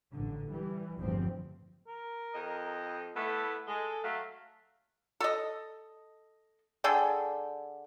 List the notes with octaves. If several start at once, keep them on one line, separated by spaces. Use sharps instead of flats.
A1 D3
E3 G3
G1 E2 A2 F3 C4
A#4
F2 D#5
A3 B3 E4 A4
G#3 A4
F#3 A3 F5
A4 D#5
D3 G#4 A4 G5